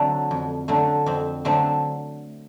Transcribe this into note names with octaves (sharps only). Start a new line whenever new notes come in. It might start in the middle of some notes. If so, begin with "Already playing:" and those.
Already playing: D3 F#3 A3 C4
F2
D3 F#3 A3
F2 C4
D3 F#3 A3 C4